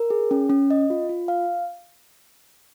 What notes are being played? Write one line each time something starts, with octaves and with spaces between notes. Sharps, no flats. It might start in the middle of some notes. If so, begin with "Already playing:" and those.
Already playing: A#4
G#4
C#4
C#4
D#5
F4
F4
F5